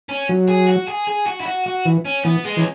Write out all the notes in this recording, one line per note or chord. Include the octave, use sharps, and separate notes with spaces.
C#4
F#3
G#4
F#4
G#4
G#4
F#4
E4
F#4
F#4
E3
C#4
E3 B3
G#3
E3 C#4